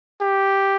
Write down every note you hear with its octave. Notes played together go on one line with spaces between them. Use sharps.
G4